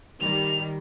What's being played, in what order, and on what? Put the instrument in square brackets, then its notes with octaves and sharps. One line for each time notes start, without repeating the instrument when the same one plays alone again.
[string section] D#3 G3 [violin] F7